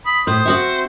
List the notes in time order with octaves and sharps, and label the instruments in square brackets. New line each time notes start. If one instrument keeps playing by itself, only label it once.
[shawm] B5 [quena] D#6
[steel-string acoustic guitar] A2 [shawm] C5
[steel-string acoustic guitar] C4 F#4 E5